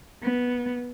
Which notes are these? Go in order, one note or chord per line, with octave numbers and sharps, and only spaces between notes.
B3